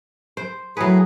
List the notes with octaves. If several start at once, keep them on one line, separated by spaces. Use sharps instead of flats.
C5
A2 F#3 G#4 B4